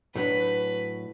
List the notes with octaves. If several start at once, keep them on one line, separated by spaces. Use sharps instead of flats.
A2 F#3 D4 B4